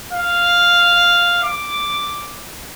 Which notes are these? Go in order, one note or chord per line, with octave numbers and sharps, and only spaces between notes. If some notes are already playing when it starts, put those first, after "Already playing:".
F5
D6